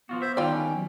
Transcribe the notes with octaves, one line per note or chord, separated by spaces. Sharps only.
F3 B3 F4 F#4
C5 E5
D3 D#3 G3 F4 D5 G5
C#4
F#3